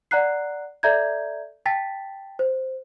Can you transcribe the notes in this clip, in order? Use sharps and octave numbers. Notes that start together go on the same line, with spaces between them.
D5 F#5 A#5 F#6 C7
A4 D5 E5 A#5 G6 G#6
G5 A5 A6 B6
C5